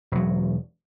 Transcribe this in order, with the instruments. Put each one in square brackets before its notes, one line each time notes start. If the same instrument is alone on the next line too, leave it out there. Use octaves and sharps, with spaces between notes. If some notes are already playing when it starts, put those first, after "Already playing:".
[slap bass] E1 F#3